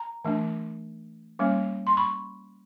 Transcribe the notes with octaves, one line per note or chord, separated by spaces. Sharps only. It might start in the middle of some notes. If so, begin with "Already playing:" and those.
Already playing: A#5
E3 A3 D4
G3 A#3 C#4
C6
B5 C#6